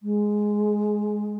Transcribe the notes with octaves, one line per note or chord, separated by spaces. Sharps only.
G#3